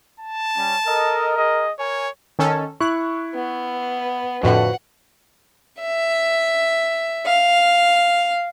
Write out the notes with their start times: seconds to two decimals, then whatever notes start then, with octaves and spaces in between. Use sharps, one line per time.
0.20 A5
0.56 G3 C#4
0.86 A4 A#4 D#5
1.37 G#4 D#5
1.79 A#4 C#5 G#5
2.39 D#3 C#4 A4
2.80 E4 C#6 F#6
3.35 B3
4.43 F2 A2 D3 F#4 B4 F#5
5.81 E5
7.27 F5